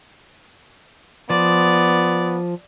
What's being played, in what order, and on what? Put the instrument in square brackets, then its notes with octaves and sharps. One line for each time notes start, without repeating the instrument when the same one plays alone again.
[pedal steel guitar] F3 [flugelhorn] B3 [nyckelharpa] D5